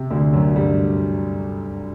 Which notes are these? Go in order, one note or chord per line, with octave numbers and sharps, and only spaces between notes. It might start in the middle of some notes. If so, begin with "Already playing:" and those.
Already playing: C3
D2 D3
F#2 F#3
G2 G3